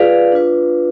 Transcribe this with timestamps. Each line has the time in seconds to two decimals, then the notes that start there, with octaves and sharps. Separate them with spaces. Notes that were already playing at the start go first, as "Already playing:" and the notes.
Already playing: F4 G#4 B4 D5 F5
0.32 D4 F4 B4